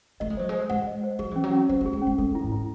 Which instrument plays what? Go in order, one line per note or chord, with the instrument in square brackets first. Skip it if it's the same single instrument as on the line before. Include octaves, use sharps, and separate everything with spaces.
[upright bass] A3 [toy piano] D#5
[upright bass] G#3
[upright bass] F#3 [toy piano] C5
[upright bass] G#3 [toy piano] C5
[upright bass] G#3 [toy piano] F#5
[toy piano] D#5
C5
[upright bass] F#3 [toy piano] G#4
[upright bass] E3 [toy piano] C#4
[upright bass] F#3
[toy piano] C#4
[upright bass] F#3 [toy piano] C5
[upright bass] A3
[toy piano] G#4
[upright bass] G#3
[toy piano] C#4
[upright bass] G#3
[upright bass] G#3 [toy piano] A4
[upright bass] E3
[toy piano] E4
[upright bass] G#2
[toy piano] E4